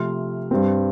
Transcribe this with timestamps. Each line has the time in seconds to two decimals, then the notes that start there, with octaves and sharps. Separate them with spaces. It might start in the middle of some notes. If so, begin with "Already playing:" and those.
Already playing: C3 F3 A3 C6 F6
0.51 G2 G3 C4